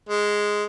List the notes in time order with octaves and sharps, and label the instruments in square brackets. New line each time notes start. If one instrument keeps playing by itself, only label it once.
[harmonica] G#3